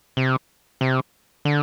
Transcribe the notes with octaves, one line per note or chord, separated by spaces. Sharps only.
C3
C3
D3